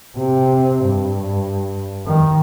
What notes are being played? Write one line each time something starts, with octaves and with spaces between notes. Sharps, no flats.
C3
G2
D#3